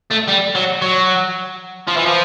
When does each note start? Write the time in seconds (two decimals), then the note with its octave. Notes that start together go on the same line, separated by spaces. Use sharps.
0.11 A3
0.29 G3
0.56 F#3
0.82 F#3
1.88 F3
1.97 E3
2.06 F3